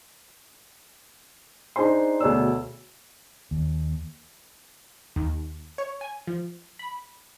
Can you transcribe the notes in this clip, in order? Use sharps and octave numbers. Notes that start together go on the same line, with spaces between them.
D4 D#4 G#4 C5 C6
D2 B2 G#4 C#5 D5 E6
D#2
D#2
C#5
G#5
F3
B5